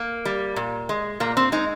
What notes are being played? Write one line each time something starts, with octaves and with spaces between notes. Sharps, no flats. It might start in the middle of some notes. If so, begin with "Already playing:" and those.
Already playing: A#3
G3
A#2
G#3
A#2 A#3
C4
G#3 D#4